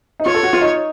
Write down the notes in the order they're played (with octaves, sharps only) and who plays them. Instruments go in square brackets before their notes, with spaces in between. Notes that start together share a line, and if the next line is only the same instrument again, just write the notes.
[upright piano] D#4
[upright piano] F4 [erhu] C#5
[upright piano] A4
F#4
F4
D#4